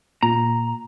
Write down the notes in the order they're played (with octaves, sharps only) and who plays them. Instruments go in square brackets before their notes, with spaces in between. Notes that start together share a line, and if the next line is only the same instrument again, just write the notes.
[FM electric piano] A#2 [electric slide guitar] A#5